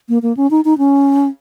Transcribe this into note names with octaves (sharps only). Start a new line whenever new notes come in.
A#3
A#3
C#4
D#4
D#4
C#4